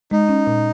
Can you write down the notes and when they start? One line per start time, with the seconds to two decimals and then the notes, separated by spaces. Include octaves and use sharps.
0.11 G#3 D#4
0.29 C#4
0.47 A#2